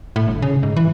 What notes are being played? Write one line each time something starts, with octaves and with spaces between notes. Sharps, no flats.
A2
G1
C#3
G#2
E3